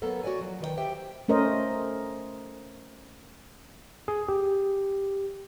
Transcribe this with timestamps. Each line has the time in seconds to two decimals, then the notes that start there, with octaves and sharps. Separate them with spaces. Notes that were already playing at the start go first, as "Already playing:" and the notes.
0.02 F#3 A#3 B3 A4
0.23 F#4 A#4 C#5 D5 G#5
0.39 F3 F#3
0.61 D#3 B4 D5 G5
0.77 G4 C5 E5 G5
1.28 A3 C#4 A#4 C5 D#5
4.08 G#4
4.29 G4